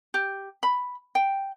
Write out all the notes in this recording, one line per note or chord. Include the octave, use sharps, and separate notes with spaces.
G4
B5
G5